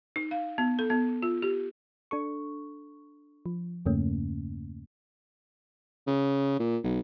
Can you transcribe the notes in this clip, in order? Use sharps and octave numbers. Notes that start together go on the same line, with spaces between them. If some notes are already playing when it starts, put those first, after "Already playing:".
D#4
F5
B3
A4
B3
F4
G4
D4 A4 C#6
F3
E2 G2 C#3 A3 A#3 C#4
C#3
A#2
B1